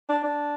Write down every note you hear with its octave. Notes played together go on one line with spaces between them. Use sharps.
D4
D4